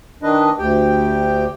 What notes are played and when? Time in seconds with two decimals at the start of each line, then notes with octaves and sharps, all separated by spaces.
0.23 D#3 D4 B4 D#5
0.59 D2 G4 G5